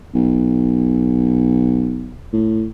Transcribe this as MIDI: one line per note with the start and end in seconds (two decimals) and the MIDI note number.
0.15 2.16 35
2.33 2.66 45